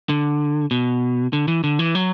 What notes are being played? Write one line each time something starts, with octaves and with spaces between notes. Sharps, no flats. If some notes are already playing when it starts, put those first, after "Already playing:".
D3
B2
D3
E3
D3
E3
F#3